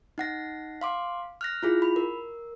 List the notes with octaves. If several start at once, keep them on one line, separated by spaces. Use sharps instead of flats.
D#4 F#5 A#6
F5 C6 D6
F6 F#6 A#6
E4 F4 G#4
B5
A#4